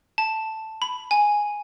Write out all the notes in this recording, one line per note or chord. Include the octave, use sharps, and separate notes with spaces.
A5
B5
G#5